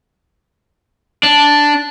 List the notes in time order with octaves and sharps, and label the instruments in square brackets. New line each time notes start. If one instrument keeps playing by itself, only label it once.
[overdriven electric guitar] D4